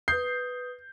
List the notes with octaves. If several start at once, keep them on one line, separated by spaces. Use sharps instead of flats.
B4 D#6 G6 C7